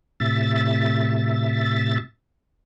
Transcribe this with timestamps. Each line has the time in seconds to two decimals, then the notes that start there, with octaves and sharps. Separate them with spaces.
0.20 A2 C3 E5 A6